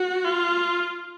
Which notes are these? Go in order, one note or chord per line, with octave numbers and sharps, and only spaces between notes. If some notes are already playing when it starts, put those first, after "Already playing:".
Already playing: F#4
F4